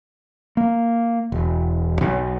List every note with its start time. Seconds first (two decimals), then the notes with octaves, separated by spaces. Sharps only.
0.57 A#3
1.32 E1
2.01 B1